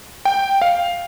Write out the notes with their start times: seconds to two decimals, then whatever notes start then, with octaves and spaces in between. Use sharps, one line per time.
0.25 G5
0.62 F5